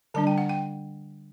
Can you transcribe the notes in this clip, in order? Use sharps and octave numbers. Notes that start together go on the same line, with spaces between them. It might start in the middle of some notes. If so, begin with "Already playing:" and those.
D3 G3 D4 A5
G5
F#5
G5